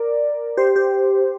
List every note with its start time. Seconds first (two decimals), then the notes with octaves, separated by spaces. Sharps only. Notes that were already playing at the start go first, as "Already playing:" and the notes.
Already playing: A#4 D5
0.57 G4 C5
0.76 G4